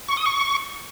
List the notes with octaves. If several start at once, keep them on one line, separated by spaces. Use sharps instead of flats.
C#6
D#6
C#6